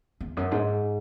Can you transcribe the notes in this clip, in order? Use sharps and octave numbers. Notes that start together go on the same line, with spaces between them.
E2
F#2
G#2